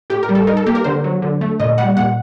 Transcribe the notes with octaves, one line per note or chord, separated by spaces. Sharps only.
A2 G4
A#4
G3
A4
D#4 A#4
A4
A#3 G4
A#4
D3 C5
F#3
D3
A3
A#2 D#5
G3 F#5
A#2 F#5